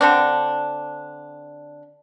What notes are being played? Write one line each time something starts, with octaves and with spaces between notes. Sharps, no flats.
D3 C4 D4